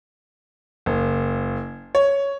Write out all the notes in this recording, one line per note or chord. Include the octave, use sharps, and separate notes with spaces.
F#1
C#5